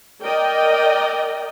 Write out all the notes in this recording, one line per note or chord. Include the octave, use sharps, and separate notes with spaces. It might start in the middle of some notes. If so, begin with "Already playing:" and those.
A#4 D5 D#5 G5